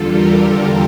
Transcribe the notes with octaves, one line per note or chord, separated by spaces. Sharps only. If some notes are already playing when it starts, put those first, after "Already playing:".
Already playing: E2 D3 G3 F4 A4
G4 A#4